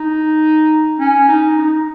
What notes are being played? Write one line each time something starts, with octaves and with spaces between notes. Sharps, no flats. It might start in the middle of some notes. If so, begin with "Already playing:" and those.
Already playing: D#4
C#4
D#4
D#4